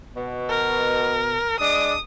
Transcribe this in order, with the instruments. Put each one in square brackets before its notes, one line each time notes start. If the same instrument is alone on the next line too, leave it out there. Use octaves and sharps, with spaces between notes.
[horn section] B2
[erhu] A#4
[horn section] G#3 D4 [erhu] D#6